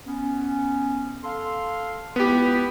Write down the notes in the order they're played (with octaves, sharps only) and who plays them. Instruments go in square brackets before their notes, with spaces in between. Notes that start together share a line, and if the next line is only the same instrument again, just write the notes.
[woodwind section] B3 C#4
A4 F5 C6
[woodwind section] C#2 E4 B5 [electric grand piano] B3 G4